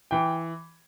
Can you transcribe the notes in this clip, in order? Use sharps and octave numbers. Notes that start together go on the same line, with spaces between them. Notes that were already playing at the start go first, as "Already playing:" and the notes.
E3 G5